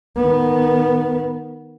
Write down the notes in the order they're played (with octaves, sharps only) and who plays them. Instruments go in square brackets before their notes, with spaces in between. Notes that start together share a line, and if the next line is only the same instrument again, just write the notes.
[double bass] D#3 B3